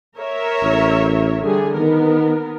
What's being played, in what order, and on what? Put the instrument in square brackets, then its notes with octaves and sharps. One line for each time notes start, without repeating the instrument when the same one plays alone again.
[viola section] A#4 C#5 E5
[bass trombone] A1
[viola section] D3 G3 G#4
[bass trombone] D#3 [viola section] B3 A#4